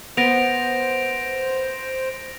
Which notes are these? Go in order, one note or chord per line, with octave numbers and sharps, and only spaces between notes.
B3 C5 A#6 D7 F7